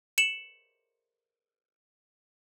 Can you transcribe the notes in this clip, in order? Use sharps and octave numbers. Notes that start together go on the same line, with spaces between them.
C#7 E7 F#7